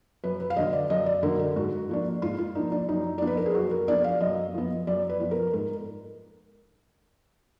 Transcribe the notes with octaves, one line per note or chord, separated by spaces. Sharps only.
F#2 B4
B4
F5
D3 F#3 D#5
D5
F#2 D#5
D5
D3 F#3 A#4
A#4
G#2 F#4
F3 A#3 D4
G#2 F4
F4
F3 A#3 D4 D#4
D4
F#2 D#4
F3 B3 D4 D5
B4
A#4
G#4
F#2 F#4
A#4
F3 B3 D4 D5
F5
F#2 D#5
F3 B3
F#2 D5
B4
F3 B3
A#4
G#2 A#4